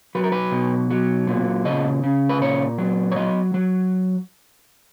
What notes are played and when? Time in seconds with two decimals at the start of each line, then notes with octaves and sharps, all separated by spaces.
0.15 F#3 B4
0.24 A#4
0.32 B4
0.52 B2
0.90 F#3
1.27 A#2
1.65 C#3 D#5
2.04 C#3
2.29 B4
2.41 A#2 C#5
2.78 F#3
3.12 C#5
3.16 F#3 D#5
3.54 F#3